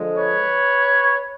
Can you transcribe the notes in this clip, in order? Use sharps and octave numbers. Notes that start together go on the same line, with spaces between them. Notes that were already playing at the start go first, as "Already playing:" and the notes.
Already playing: D3 F3 G#3
B4 C#5